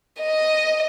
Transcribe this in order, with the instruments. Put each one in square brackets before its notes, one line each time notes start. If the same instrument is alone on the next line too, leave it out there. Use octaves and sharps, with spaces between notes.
[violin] D#5